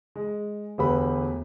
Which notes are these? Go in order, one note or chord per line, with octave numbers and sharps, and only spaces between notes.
G#3
E1 D2 G4 B4 B5